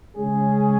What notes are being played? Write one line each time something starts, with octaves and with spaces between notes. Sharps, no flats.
C#3 G#3 C#4 G#4